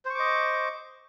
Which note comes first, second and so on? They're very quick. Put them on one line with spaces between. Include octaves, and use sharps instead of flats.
C5 C#6 D6 D#5